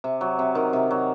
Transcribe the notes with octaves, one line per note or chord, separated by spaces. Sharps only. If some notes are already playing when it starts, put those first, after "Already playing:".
C3
F#3
C3
D#3
C3
F#3